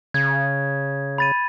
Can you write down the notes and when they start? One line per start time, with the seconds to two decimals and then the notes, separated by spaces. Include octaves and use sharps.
0.14 C#3 G#6
1.18 B5 A6 D#7